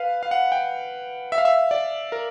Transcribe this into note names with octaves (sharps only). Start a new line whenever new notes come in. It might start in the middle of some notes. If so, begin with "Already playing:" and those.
Already playing: B4 F5
F5
F#5
G5
E5
F5
E5
D5
A#4